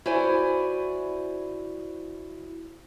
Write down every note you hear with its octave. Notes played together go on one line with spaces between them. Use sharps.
E4 F#4 C5 D5 G#5